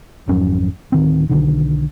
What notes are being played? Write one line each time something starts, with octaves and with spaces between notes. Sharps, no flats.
G#1 F2 F#3 C#4
D1 D#3 C4
B1 D3 D#3